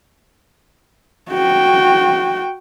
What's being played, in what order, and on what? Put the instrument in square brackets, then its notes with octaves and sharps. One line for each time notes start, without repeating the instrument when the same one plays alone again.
[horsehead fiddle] F#4 G5